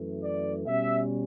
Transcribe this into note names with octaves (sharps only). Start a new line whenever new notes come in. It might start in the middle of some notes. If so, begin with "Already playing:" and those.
Already playing: F#2 E3 A3
D5
B2 G3 C#4 E5